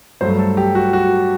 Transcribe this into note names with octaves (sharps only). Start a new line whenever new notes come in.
G2 F#3 A3 C5
A4
G4
F#4
F#4